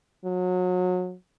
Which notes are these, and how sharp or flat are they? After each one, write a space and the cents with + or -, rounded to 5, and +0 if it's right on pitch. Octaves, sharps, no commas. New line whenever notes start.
F#3 -30